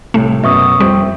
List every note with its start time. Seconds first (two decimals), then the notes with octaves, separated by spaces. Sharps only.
0.14 C2 A2 A3
0.44 F#2 B2 E5 C#6 D#6
0.80 F2 G3 C4 C5